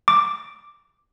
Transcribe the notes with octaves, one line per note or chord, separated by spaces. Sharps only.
D6